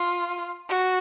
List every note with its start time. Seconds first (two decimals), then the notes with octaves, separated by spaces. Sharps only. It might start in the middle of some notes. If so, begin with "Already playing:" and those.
Already playing: F4
0.69 F#4